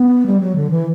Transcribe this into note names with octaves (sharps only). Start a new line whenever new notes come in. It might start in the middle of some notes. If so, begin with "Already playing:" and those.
Already playing: B3
G3
F#3
D3
E3